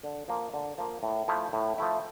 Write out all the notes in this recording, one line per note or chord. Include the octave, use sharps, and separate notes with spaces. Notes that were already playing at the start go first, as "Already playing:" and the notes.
D3
F3 A#3
D3
F3 A#3
A2
F3 A3 E4
A2
F3 A3 E4